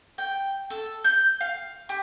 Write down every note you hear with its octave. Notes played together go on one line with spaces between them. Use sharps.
G5
A4
G6
F5
G4